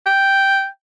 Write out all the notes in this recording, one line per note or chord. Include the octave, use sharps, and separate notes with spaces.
G5